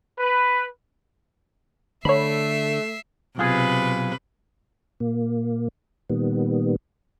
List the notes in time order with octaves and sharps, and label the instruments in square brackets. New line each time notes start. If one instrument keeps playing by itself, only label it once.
[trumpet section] B4
[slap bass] D3 [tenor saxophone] A3 [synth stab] C#5 B5 [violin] E5 C7
[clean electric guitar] B1 F4 G#4 [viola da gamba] C3 B4
[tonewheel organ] A#2 A#3
A#2 D#3 G3 B3